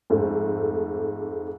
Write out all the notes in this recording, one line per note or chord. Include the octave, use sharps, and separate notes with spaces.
F2 G#2 A3